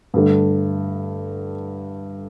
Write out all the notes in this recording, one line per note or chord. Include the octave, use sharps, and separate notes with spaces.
G2 D3 A3